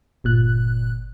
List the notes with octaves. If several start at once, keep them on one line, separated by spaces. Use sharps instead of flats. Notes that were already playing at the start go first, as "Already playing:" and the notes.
G1 A#2 F#6